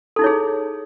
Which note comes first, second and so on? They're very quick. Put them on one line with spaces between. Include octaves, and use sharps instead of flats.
A4 D#4 E4 C#5 G#4